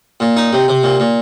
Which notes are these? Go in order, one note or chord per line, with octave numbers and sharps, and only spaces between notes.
A#2
D#4
C3
C3
A#2
A#2